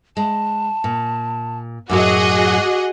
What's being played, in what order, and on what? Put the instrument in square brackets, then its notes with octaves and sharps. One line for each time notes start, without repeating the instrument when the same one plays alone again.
[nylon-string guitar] G#3 [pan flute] A5
[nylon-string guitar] A#2
[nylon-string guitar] F#2 A2 F#3 [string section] F#4 G#4 D#5 [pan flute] D6